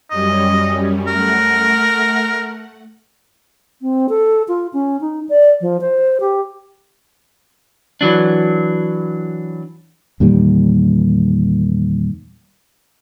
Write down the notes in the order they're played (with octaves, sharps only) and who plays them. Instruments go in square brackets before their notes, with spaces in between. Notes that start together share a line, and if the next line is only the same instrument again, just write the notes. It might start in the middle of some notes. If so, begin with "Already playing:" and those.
[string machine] F#2 G3 C#4 [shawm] D#5
[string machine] A3 F#5 [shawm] A#4
[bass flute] C4
A4
F4
C#4
D#4
D5
F3
C5
G4
[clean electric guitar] E3 F#3 D4
[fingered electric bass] E2 A#2 D#3 G3